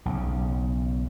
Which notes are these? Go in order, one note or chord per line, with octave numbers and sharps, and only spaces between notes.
B1 C#3